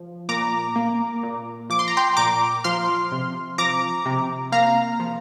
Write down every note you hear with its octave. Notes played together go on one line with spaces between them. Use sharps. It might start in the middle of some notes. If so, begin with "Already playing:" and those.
Already playing: F3
A#2 A#5 D6
A#3
A#2
F3 D6
C6
A#5
G5 C6
A#2 A#5 D6
F3 C6 F6
C3
F3 A#5 D6
C3
A#3 F5 A#5
F3